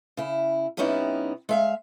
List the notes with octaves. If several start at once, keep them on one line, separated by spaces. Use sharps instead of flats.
C#3 E4
C3 G3 B3 C#4 D#4 E4
G#3 E5 F5